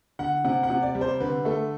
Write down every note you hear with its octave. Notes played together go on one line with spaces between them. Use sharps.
D3 F#5
C3 F#5
F#5
C3
D5
G3
C5
D3 B4
A3 A4